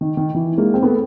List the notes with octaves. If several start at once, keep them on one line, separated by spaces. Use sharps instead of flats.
D#3
D#3
E3
G#3 A#3
C4
A3 B3